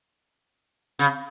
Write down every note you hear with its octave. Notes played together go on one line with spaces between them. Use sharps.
C#3